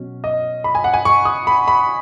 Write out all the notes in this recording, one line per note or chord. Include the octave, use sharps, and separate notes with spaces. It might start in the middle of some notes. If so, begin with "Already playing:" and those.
Already playing: B2 F#3 C#4
D#5
B5
G#5
F#5
G#5
C#6
D#6
B5
B5